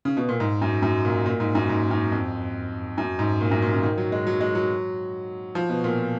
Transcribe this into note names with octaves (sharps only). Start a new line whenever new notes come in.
C#3
B2
A#2
G#2
F#2
F#2
A#2
A#2
G#2
F#2
G#2
F#2
F2
F#2
G#2
A#2
F#2
A#2
C#3
D#3
F#3
G#3
F#3
G#3
F#3
F3
B2
A#2